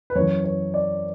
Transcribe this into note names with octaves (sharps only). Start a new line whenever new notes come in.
B4
F#2 E3 C#5
C#5
D5